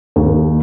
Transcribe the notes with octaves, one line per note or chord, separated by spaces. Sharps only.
D#2